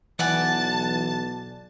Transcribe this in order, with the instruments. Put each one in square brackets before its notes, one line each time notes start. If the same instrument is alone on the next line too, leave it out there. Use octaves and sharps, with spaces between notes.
[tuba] B1 [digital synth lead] E3 [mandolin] D5 F#5 G#5 [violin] A5